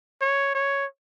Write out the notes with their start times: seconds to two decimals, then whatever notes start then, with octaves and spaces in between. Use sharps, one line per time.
0.21 C#5
0.55 C#5